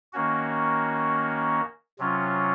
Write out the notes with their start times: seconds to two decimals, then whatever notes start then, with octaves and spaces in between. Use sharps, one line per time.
0.13 D#3 A#3 C#4 F#4
1.99 C3 F#3 C#4 F4